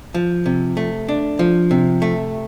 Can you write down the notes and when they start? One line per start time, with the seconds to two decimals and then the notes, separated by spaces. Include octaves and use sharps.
0.14 F3
0.46 C3
0.77 A3
1.09 D4
1.39 F3
1.71 C3
2.02 A3